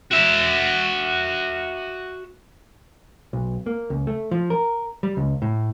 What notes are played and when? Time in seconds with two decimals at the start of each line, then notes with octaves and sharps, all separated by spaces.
0.12 F#4 E5
3.33 B1
3.66 A#3
3.90 C#2
4.07 A3
4.31 F3
4.50 A#4
5.03 G3
5.17 C#2
5.42 A2